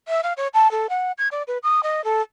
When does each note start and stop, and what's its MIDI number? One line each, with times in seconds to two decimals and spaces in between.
0.08 0.21 76
0.23 0.33 77
0.37 0.48 73
0.54 0.70 81
0.71 0.87 69
0.89 1.12 78
1.18 1.28 92
1.31 1.43 74
1.47 1.58 71
1.63 1.81 87
1.83 2.04 75
2.04 2.22 69